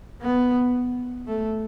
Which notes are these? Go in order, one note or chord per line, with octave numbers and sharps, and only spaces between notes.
B3
A3